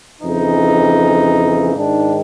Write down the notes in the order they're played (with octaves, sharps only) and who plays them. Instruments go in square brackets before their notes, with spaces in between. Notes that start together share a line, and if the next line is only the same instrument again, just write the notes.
[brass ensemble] F2 C#3 E3 D#4
G#2 D#3 D4